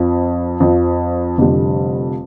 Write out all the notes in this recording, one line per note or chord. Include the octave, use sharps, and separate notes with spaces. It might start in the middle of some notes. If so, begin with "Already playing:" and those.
Already playing: F2 F3 C4
F2 F3 C4
F1 F2 D3 G3